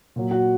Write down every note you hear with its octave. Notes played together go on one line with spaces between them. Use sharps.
A#2 F#3
F#4 F#5